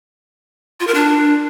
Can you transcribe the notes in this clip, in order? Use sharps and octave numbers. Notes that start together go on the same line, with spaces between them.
F4
A#4
D4